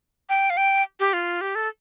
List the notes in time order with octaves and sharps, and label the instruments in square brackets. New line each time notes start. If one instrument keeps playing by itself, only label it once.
[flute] G5
F5
G5
G4
F4
G4
A4